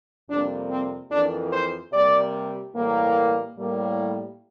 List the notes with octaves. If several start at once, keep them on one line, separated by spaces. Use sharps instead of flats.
F2 C3 G3 A#3 D4
C4
F2 E3 A#3 D4
C5
C3 G3 A#3 D5
A2 E3 G3 A#3
A2 G3 A#3